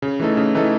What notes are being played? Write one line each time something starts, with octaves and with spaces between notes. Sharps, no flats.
C#3
E3 A3 D#4 A4
C#3
E3 A3 D#4 A4